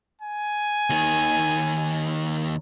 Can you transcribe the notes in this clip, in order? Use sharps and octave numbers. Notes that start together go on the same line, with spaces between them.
G#5
D#2 D#3